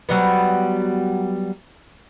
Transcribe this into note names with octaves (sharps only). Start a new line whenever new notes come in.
F#3 G3 B3